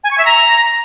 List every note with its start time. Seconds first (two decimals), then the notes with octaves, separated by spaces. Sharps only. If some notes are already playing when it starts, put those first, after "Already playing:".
0.04 G#5
0.11 C#6
0.18 E5
0.25 A#5